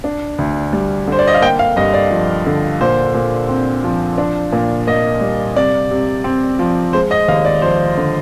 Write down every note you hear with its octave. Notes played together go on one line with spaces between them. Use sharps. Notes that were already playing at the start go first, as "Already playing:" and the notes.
D4
D2
G3
D3 C5
D5
D#5
F5
A#3 G5
F5
G2 D#5
D5
F3
D3
A#2 C5
A#2
C4
F3
D4
A#2
A#3 D#5
G3
C3 D5
C3
C4
F3
G#3 C5
D#5
D#2 F5
D5
F3 C5
D3